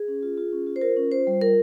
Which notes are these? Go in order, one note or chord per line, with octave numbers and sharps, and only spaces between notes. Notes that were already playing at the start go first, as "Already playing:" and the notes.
Already playing: G#4
C#4
F4
F4
C#4
F4
C5
F4 A#4
C#4
F4 C5
G3
F4 A#4